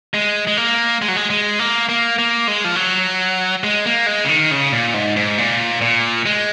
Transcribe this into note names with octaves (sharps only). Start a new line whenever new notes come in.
G#3
G#3
A#3
G#3
F#3
G#3
G#3
A#3
A#3
A#3
G#3
F3
F#3
G#3
A#3
G#3
C#3
D#3
C#3
A#2
G#2
G#2
A#2
A#2
G#3